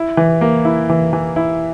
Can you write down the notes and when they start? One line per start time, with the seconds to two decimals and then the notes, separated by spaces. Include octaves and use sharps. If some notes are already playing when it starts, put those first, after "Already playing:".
Already playing: E4
0.17 E3
0.41 A#3
0.65 E4
0.89 E3
1.13 E3
1.36 E4